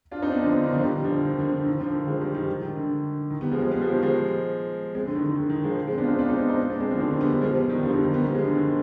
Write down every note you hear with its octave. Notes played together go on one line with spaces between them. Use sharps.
D4 F4
C4 D#4
B3 D4
D3 F3
B3 D4
D#3
D3 F3
D#3 G3
D3 F3
D#3
D3
D3
D#3
D3 F3
D#3
F3 G#3
D#3 G3
D#3 G3
D#3
D3
D#3
G3 B3
F3 G#3
F3 G#3
G3 B3
F3 G#3
D#3 G3
F3 G#3
G#3 C4
D3
D#3
D3
D#3
D3
D#3
F3 G#3
G#3 C4
B3 D4
F4
C4 D#4
D4 F4
C4 D#4
B3 D4
C4 D#4
B3 D4
G#3 C4
D3 F3
D#3
D3
G3 B3
G3 B3
F3 G#3
G3 B3
D#3 G3
D3 F3
D#3 G3
D#3 G3
G3 B3
G3 B3
F3 G#3
D3
D#3
D3